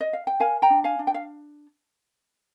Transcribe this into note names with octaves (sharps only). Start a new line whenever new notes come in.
D#5
F5
G5
A#4 F5 G#5
G5 A#5
D4
F5 G#5
D4
G5
F5